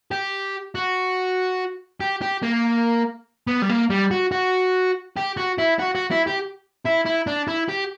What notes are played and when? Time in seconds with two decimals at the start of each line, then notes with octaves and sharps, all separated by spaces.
0.11 G4
0.75 F#4
2.01 G4
2.22 G4
2.43 A#3
3.47 B3
3.62 G3
3.69 A#3
3.90 G3
4.11 F#4
4.32 F#4
5.17 G4
5.37 F#4
5.58 E4
5.79 F#4
5.95 F#4
6.11 E4
6.27 G4
6.85 E4
7.05 E4
7.27 D4
7.48 E4
7.69 G4